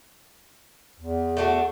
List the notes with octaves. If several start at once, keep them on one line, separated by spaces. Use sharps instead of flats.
E2
A3 D4 F#4